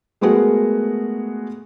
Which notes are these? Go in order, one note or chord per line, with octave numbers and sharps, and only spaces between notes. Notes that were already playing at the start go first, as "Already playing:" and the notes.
G#3 A3 B3 F#4 G#4 A#4